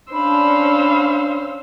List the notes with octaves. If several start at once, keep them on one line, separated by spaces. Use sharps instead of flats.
C#4 D4 C5 F5 B5 E6